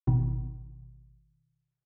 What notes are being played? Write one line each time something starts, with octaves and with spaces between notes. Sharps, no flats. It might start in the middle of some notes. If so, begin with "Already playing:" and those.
G#1 B2 D#3